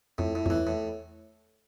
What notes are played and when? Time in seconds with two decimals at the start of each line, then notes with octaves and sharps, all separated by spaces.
0.18 F2 A2
0.35 A2
0.46 F2
0.50 E2 E3
0.67 A2